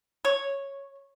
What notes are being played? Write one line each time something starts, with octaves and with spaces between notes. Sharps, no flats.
C#5